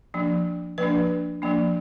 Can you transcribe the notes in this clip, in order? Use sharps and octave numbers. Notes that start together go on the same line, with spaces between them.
F3 A#3 D4
F3 A#3 D4 B4
F3 A#3 D4